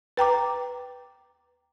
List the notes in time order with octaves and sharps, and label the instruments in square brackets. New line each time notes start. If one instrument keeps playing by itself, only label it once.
[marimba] B4 G5 A#5 D6